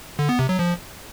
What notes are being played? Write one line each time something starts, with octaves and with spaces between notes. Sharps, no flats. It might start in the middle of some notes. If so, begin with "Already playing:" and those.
D3
B3
C3
F#3
F3